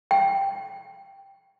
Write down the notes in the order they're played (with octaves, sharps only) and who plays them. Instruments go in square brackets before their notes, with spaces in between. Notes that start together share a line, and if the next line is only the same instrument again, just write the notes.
[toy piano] G5